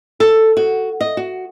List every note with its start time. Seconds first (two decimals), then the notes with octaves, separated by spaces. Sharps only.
0.20 A4
0.57 F#4
1.01 D#5
1.17 F#4